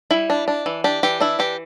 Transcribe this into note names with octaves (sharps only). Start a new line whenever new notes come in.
G3 E4
D4
D4
E3
D4 G4
E3 G4
D4 E4
E3 G4